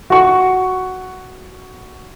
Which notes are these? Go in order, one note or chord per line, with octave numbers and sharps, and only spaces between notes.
F#4 C#6